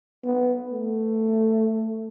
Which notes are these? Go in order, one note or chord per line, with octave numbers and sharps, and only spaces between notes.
B3
A3